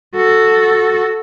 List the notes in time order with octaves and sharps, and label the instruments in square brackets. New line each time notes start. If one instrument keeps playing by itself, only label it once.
[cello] F#4 A4